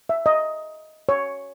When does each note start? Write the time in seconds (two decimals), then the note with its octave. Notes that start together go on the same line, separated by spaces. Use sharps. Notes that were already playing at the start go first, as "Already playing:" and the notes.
0.09 E5
0.26 D#5
1.09 C#5